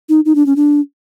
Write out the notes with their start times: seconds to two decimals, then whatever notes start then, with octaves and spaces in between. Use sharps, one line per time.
0.09 D#4
0.25 D#4
0.35 D4
0.46 C#4
0.56 D4